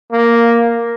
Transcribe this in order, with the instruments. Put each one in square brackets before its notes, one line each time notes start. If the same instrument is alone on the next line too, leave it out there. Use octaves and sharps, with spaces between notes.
[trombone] A#3